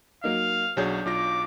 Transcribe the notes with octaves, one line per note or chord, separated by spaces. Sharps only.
F#3 A#3 D#4 F5
B1 F#3 D4 G#4 C#5 G6
B1 F4 D6 A#6